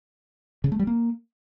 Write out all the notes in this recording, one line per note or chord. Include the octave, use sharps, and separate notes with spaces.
C#3
A3
G3
A#3